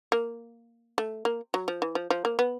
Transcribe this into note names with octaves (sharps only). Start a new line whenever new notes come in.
A#3
A3
A#3
F#3
F3
E3
F3
F3
A#3
B3